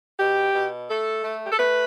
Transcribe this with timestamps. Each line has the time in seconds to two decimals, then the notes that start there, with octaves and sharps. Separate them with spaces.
0.18 B2 G4
0.54 B2
0.89 A3 A4
1.24 A3
1.44 G4
1.52 A4
1.59 A3 B4